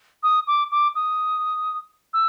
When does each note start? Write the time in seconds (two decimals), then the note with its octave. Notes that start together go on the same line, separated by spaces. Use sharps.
0.23 D#6
0.47 D6
0.71 D6
0.95 D#6
2.13 E6